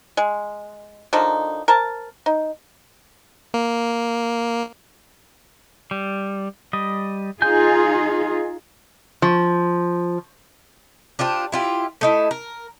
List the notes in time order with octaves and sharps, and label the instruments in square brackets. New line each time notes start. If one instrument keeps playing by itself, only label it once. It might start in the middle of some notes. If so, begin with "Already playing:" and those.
[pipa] G#3
D3 D#3 F3 D#4
A#4 C5 A5
D#4
[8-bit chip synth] A#3
[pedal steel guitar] G3
G3 D#5
[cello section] D#4 F4 G#4 [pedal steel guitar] G#5 G6
[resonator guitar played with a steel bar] F3
[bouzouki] D4 F4 G4 C5
E4 F4 G4
A3 D#4 E4
A#4